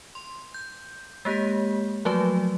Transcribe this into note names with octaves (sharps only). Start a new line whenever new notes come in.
C6
G6
G#3 A#3 G4 G6 B6
F3 F#3 A3 F#4 B4